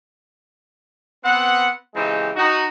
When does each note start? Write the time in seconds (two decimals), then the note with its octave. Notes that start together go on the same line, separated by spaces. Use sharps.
1.24 B3 C4 F#5
1.95 C#3 E3 G#3 C4 D#4 G4
2.36 D#4 F#4